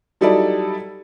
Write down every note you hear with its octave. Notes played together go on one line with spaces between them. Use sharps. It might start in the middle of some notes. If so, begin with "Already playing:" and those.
F#3 G3 D#4 E4 A4 D5